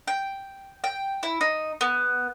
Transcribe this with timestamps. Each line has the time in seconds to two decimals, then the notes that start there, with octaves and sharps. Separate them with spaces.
0.07 G5
0.84 G5
1.23 E4
1.41 D#4
1.81 B3